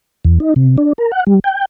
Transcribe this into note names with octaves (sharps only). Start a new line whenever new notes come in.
E2
D#4
C3
D4
A#4
F#5
G3
G5